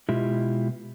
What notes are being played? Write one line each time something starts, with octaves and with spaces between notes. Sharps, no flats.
B2 G#3 E4 F4 G4